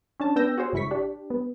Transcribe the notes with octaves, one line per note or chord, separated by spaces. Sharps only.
C#4 D4 A5
B3 D4 G5 E6 G6 A#6
F#4 G#4 C5 C#5
G#1 C#3 E4 C#6 B6
D4 G4
B3